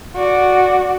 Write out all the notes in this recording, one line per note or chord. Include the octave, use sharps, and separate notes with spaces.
F#4 D5